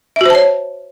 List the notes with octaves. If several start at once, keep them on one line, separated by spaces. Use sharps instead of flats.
F#4 C5 C#5 E5 A5